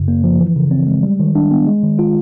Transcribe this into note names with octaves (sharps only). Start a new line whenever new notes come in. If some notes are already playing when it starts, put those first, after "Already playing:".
Already playing: F#2 C#3
A#3
F3
E3
C#3
C4
G#3
G3
D#3
D4
B3
G#3
D#3
F4